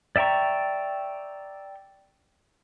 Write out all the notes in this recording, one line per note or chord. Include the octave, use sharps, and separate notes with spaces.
D5 E5 G5 A#5 C#6